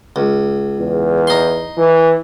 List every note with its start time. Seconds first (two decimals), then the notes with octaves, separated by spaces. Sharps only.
0.16 C#2
0.79 E2
1.27 D#4 C6
1.77 E3